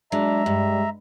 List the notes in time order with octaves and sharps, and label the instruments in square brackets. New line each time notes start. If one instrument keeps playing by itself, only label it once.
[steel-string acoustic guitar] F#3 [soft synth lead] G#3 [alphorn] D4 [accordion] E5 A#5
[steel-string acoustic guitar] G2 [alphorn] G3